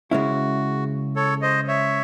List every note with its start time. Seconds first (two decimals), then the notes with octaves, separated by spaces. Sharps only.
0.11 C#3 G#3 C#4 E4 F#4
1.16 A4 C#5
1.42 C5 D#5
1.68 C#5 E5